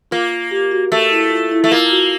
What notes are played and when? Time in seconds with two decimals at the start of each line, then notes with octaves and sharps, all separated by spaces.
0.11 A#3 F4
0.32 F4
0.51 G4
0.71 F#4
0.92 A3
1.11 E4
1.31 F4
1.52 E4
1.64 A3
1.71 A#3 F4
1.90 F#4